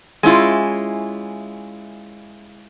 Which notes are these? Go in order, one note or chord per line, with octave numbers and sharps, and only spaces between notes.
G#3 C#4 E4 F4